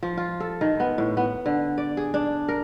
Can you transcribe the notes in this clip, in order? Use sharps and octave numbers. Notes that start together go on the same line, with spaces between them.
F3
F4
A4
D#3
B3
A2
B3
D3
D5
G#4
D4
A#4